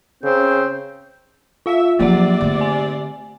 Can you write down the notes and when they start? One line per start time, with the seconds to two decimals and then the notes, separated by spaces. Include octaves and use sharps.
0.23 C#3 C4 G6
1.66 F4 E5 F5
1.99 G#2 C3 F3 F#3 A#3 D5 F#5
2.41 D3 A3
2.61 G#5